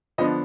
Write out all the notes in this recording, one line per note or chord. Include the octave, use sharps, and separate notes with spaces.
D3 F3 B3 D4 D#5